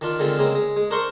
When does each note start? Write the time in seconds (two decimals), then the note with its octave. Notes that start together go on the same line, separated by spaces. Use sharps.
0.01 D#3 D4 F4
0.19 D3 D#3 G#3 C4 F4
0.39 C#3 G#3 A#3 C4
0.55 G#3
0.76 G#3
0.91 D4 A#4 C5 C6 C#6